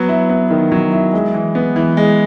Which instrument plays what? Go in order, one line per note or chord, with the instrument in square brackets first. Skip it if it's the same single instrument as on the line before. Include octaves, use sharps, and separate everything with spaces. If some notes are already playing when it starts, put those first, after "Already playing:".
Already playing: [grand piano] F#3 B3
E4
B3
D#3
F#3
E4
G#3
E3
B3
E3
G#3